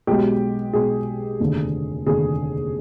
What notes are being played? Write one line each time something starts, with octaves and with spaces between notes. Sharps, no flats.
B1 B2 G#3 G4
B1 B2 G#3 G#4
F1 D#2 D3
F1 D#2 D3 G#4